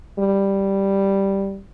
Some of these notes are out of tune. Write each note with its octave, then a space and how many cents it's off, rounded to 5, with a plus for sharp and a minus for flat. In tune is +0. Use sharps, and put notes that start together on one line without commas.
G3 +0